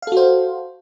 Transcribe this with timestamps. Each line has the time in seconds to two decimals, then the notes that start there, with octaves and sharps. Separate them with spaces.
0.02 F5
0.07 A4
0.12 F#4
0.17 C5